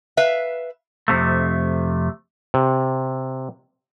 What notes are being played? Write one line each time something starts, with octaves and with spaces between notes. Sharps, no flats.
B4 E5 F5
F2 C3 A3
C3